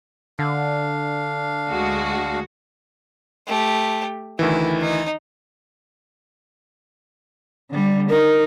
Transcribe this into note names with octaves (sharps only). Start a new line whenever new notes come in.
D3 D4 F5
D2 G#3 F#4
A3 G4
D2 D#3 E3 E4
D#4
D3 G3
D#4 A#4